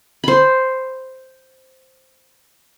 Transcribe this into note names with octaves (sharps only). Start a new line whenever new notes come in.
C5 B5